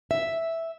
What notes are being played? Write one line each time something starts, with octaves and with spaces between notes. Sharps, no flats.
E5